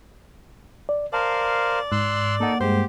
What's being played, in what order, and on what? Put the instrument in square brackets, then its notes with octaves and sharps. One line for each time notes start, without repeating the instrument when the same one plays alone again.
[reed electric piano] D5
[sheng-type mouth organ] A#4 C5 F5 [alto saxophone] D5 [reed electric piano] A5
[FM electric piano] G#2 [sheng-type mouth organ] C6 E6 F#6
[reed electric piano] A#3 F#5 [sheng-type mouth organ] D#4 A4
[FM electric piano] G2 G#3 [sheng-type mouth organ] G4 [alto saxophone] C5